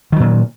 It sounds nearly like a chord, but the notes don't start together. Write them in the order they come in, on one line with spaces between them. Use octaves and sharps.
D#3 F#3 A#2